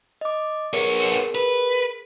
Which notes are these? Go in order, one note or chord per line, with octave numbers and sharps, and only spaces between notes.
D#5 D6
B3 G#4 A#4 C#5
B4